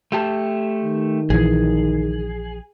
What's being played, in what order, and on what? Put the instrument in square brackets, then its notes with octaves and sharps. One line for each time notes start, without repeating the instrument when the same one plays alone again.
[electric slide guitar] A3 G4 A5
[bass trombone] D#3
[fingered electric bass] A#1 E3 [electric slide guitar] G#4